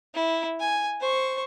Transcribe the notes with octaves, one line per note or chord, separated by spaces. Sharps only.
E4
G#5
C5 C#6